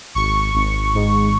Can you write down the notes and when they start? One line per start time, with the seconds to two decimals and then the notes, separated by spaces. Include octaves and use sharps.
0.15 G#1 C#6
0.54 G#1
0.94 G#2